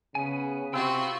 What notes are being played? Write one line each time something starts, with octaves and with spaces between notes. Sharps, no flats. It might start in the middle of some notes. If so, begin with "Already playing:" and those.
C#3 B3 G#5
C3 C4 F4 F#4 G5 B5 E6